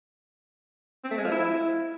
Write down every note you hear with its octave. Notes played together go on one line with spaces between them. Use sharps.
C4
A3
G#3
F3
E4